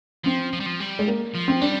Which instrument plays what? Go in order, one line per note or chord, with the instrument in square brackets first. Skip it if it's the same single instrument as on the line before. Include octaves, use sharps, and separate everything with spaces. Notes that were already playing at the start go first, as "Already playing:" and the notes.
[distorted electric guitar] F3 [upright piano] C4
[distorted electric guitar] F3
G3
F3
G3
[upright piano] G#3
A#3
[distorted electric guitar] F3
[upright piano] C4
[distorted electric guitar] G3 [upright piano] D4